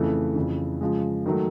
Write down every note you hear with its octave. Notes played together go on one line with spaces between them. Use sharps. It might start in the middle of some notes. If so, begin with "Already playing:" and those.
Already playing: F2 C#3 E3 A3
F2 C#3 E3
C#3 F3 G#3
D#3 F#3 A3